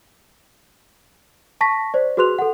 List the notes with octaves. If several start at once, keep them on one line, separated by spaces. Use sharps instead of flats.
A5 C#6 A#6 B6
C5 D5
F#4 G#4 B4 C6 F#6 F7
A4 F#5